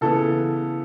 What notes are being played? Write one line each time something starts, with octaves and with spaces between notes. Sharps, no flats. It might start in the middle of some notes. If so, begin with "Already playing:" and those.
C#3 E3 B3 A4